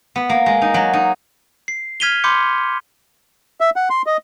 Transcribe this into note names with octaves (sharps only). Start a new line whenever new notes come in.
B3
A#3
G#3
D#4
F#3
D#4
C7
F6 G#6 B6 D#7 F7 G7
B5 C6 D6 G6 C#7
E5
F#5
C6
D#5